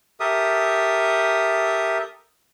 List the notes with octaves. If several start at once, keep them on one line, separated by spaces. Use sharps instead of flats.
G4 A4 A#4 E5 D#6